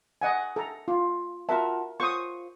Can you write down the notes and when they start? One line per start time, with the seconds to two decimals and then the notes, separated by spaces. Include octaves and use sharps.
0.21 D#5 F#5 G#5
0.56 A4 A#5
0.88 F4
1.49 F4 F#4 A#4 E5 A5
2.00 F4 C5 C#6 D#6